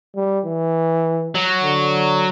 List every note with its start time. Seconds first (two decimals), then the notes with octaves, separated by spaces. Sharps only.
0.16 G3
0.45 E3
1.35 F#3
1.63 D3